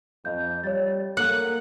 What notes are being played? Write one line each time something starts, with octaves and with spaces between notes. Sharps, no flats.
F2 D#5 F5 G6
G3 C#5 A6
A#3 A4 F#5